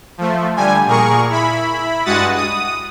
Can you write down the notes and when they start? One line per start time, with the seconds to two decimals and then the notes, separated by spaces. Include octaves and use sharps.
0.18 F3 A3
0.56 D3 G3 G#5
0.86 A#2 G#4 A#4 C#6
1.29 E4 B5
2.05 G2 G#3 F#4 F#5 D#6 A6
2.36 D#6